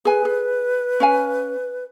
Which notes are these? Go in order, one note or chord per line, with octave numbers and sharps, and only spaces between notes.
G#4 B4 G#5
G#4
C#4 F5 G#5